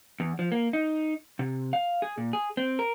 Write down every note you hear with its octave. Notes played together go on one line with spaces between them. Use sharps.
E2
F3
A#3
D#4
C3
F5
G#4
A#2
G#4
C4
A#4